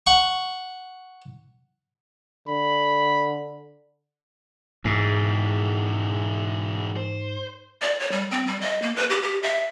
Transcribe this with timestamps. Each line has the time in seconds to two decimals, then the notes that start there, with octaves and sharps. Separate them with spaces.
0.07 F#5 C#6
2.48 D3 B5
4.85 G#2 E3 G#3
6.97 C5
7.82 D5
7.99 C#5
8.12 G3
8.31 C4
8.47 G3
8.61 D#5
8.82 A#3
8.96 B4
9.10 G4
9.23 G4
9.43 E5